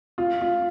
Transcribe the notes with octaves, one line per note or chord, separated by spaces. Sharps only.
F4
F4